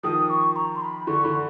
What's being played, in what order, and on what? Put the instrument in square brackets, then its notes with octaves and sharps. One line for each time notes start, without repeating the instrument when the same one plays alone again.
[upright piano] D#3 F3 [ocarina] D#6
[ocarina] C#6
A#5
C6
B5
[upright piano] D3 E3 [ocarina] C#6
[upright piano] D3 E3 [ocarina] B5